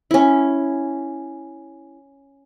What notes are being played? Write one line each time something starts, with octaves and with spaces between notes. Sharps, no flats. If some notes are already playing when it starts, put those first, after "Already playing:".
C#4 E4